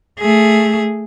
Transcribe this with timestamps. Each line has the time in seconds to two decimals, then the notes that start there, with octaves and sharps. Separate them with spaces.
0.20 A3 G#4